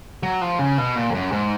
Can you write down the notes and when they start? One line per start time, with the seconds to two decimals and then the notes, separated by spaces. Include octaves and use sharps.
0.23 F#3
0.41 F3
0.59 C#3
0.78 B2
0.96 A#2
1.10 F2
1.15 F#2
1.32 G#2